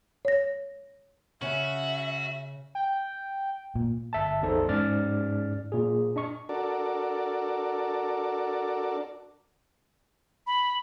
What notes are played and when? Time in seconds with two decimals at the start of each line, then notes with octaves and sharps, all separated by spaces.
0.25 C#5 A#6
1.42 C#3 C#4 F#4 E5
2.75 G5
3.75 A#2
4.13 G1 E5 A5
4.42 A1 E2 D#4 A4 C5 D5
4.68 G#2 C#4 D5 F6 A6
5.72 A#2 G#4
6.16 D4 D#5 C#6
6.49 D4 F#4 A4 A#4 D5
10.47 B5